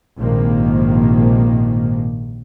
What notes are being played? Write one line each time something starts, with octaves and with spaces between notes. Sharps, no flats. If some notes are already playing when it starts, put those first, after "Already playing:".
A#1 G#2 C3 D#3 F3 A#3